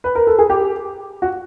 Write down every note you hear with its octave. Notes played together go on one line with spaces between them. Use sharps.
B4
A#4
A4
G#4
G4
F#4